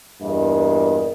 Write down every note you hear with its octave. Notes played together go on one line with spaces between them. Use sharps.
E2 G2 A#2 F4 A#4 D#5